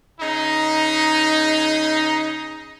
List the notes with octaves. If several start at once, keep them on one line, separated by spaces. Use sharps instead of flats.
C#3 D#4